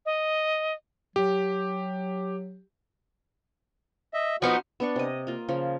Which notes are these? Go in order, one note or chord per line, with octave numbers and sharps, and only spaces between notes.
D#5
F#3 G4
D#5 E5
F3 B3 D#4 F#4 F#5
B3 D4 C#6
C3 D#5
A#3 F4
C#3 F3